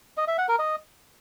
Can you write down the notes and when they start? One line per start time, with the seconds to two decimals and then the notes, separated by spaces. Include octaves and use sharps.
0.17 D#5
0.28 E5
0.38 F#5
0.49 A#4
0.59 D#5